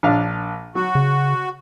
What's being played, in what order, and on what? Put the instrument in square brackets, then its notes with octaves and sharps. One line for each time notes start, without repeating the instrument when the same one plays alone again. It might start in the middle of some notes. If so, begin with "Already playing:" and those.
[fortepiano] A#1 D4 F5
[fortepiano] F#3 [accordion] F#4
[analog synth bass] C#3